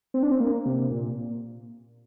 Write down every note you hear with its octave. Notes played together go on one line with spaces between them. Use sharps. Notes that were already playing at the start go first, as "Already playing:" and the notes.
C4
D4
C4
A#3
C3
A#2